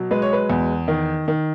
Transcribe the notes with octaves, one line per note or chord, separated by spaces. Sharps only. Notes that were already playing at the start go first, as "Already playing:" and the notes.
Already playing: B2 F#3
G#3 B4
C#5
B4
E2
D#3
D#3